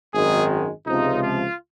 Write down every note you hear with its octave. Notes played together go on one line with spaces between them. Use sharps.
G#1 F#2 D#3 G#3 G#4
C#2 C3 F3 D#4
F4